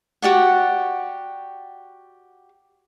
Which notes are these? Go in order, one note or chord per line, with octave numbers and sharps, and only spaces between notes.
F#4 G4 D5 F#5